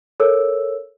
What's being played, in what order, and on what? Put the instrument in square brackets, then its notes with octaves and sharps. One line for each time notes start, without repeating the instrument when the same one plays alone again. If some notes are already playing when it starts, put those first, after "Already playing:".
[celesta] A4 A#4 C#5 E6